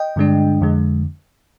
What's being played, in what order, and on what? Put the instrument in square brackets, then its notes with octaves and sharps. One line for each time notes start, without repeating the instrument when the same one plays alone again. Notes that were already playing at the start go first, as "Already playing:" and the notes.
Already playing: [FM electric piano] D#5 G5
G2 D3 G#3 D4
F2 D3 G#3